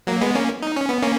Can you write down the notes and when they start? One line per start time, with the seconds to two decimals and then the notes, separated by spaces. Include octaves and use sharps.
0.07 F#3 A#3
0.21 G#3 B3
0.35 A#3 C#4
0.62 D#4
0.76 C#4
0.89 B3
1.03 A#3 C#4